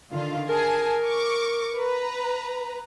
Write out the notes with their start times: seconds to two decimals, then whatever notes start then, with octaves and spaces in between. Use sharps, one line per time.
0.11 D3 D#3 F4
0.49 G#4 A#4 G#5 A5
1.07 C#6 D6
1.76 B4 A#5